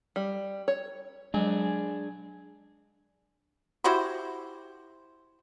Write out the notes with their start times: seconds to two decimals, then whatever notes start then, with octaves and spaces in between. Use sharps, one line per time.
0.16 G3
0.68 C#5
1.34 F#3 G#3 D4 G#4
3.84 E4 F#4 G4 C5